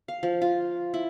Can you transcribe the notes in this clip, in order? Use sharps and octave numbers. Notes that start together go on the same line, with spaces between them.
F5
F3
F4
E4